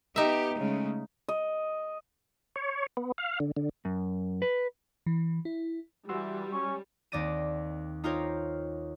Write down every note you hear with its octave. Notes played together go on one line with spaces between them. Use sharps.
B3 D#4 G4 E5
C#3 G#3 A3
D#5
C#5
B3
F5
D3
D3
F#2
B4
E3
E4
E3 G3 F#4 C6 E6
C#4 C#6
D#2 C4 D5 A#6 D#7
D#4 F4 G4 A#4 C5 C#5